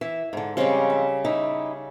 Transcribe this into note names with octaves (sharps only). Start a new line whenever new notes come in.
E3 E5
G#2 D3
C#3 F3 G3 G#3 C4
E5
D#4 E4 G4 E5